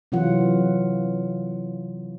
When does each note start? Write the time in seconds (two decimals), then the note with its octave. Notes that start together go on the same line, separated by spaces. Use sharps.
0.12 C3 E3 F#3 F4 F#5